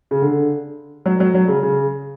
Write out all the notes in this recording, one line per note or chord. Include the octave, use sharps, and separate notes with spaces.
C#3
D3
F#3
F#3
F#3
C#3
C#3